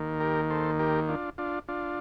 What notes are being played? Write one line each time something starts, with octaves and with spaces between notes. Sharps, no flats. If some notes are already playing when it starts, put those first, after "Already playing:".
Already playing: D#2 D#3 A#3
G4 A#4
A4 C5
G4 A#4
D4 F4
D4 F4
D4 F4